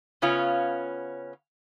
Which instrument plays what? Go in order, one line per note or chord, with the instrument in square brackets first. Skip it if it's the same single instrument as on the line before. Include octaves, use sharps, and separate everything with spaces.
[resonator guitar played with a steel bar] C#3 B3 C#4 F4